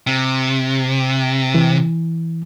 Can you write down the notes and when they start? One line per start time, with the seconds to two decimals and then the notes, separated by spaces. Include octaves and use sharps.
0.07 C3
1.55 E3